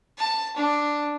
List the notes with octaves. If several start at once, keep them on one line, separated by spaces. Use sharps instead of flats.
A5
D4